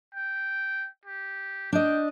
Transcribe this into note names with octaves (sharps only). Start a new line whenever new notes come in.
G5
G4
D4 D#5 G5